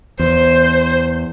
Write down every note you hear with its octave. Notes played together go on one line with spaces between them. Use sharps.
E2 C5